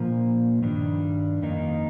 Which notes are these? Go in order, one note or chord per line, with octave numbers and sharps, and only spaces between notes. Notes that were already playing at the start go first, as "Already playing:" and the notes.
Already playing: A#2 F3 A#3
G2 D#3 G3 D4
F2 D#3 A#3 D#4